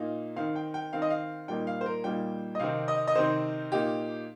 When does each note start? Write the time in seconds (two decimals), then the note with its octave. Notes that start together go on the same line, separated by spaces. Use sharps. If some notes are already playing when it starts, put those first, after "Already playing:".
Already playing: A#2 A#3 D#4
0.36 D#3 C4 D#4 F5
0.56 G5
0.74 G5
0.93 D#3 C4 D#4 F5
1.02 D#5
1.10 F5
1.48 A#2 G3 A#3 D#4 G5
1.67 F5
1.81 C5
1.86 A#4
2.04 A#2 G3 A#3 D#4 G5
2.55 D#5
2.60 C3 D#3 C4 D#4 F5
2.88 D#5
3.08 D#5
3.15 C3 D#3 C4 D#4 C5
3.72 A#2 A#3 D#4 G4